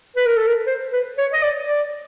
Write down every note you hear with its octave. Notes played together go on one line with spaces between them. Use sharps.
B4
A#4
A4
A#4
C5
B4
C#5
D#5
D5
D5